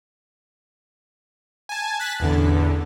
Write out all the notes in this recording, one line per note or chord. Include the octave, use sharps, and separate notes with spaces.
G#5 A5
F#6 A6 B6
A1 E2 D3